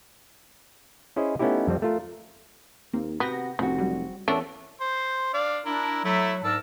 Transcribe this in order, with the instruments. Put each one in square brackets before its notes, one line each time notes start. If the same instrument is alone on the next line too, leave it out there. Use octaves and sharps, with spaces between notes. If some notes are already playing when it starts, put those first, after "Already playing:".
[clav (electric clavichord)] C#4 E4 G#4 C5 D#5
A3 B3 C#4 D#4 E4 G4
F2 G3 C4
A3 F4 A#4
[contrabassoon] D#2 [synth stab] A#3 C4
[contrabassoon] C3 [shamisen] B3 [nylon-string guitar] F#4 [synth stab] G5 A#6
[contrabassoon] F1 [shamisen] C#3 [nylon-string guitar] C4 F#4
[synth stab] F#3 G3
[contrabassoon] E2 [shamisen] A3 D4 [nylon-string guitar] C#4 [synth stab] A#4 F#5 E6
[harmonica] C5
D4 D5 F5
[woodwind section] D4 [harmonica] E4 A#4
[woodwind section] F#3 [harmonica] A3 E4 E5
[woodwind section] G#2 A#4 [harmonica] D4 A5 E6